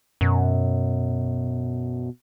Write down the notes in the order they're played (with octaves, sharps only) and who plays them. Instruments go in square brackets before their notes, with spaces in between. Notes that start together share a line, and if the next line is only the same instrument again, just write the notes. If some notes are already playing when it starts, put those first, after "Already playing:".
[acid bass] F#2 [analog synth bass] B2